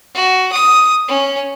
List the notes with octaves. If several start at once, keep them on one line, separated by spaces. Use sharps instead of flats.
F#4
D#6
C#4